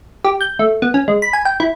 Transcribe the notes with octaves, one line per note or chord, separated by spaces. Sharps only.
G4
G6
A3
B3
C#4
G#3
B5
G#5
G5
E4